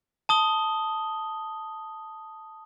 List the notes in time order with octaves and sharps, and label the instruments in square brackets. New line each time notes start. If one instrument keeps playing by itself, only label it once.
[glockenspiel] A5 D#6 G7